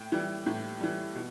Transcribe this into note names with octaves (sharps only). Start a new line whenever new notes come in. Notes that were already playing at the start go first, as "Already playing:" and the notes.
Already playing: A2 G5
E3 G3
A2
E3 G3
B2